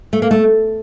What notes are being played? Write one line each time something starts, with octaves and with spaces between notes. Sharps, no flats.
A3
A#3
A3